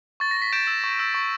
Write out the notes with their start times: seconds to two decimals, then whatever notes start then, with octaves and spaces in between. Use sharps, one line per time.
0.20 C#6 A6
0.31 A#6
0.37 C#6
0.42 B6
0.53 G6 D7 E7
0.67 E6
0.84 C#6
0.99 E6
1.14 C#6